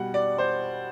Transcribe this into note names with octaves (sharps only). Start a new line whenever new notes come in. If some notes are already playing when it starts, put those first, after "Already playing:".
Already playing: B2 G3 F#5
D5
C5